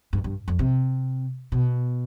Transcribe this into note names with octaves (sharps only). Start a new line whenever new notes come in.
G2
G2
F2
C3
B2